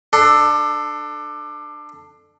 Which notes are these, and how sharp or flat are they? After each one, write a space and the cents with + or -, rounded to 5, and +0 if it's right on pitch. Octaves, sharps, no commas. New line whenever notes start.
D4 +20 A4 +0